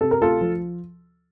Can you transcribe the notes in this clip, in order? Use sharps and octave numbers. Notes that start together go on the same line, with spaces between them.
C3 A4
A#4
D2 F4 A4
F3